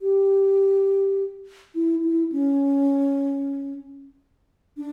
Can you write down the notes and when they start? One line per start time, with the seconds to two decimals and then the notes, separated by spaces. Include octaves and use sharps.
0.01 G4
1.75 E4
2.03 E4
2.32 C#4
4.77 D4